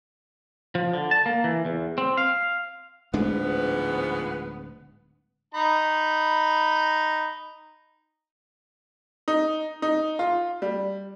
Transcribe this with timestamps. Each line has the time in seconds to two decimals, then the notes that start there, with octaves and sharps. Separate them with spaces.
0.75 F3
0.94 D3
1.11 A5
1.26 A#3
1.44 E3
1.65 E2
1.98 C4
2.17 F5
3.13 D1 G#2 F3 G#3 B3 D4
5.54 D#4 A#5 B5
9.28 D#4
9.82 D#4
10.19 F4
10.62 G3